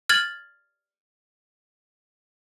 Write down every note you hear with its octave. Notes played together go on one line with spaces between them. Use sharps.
F6 G#6 A6 F#7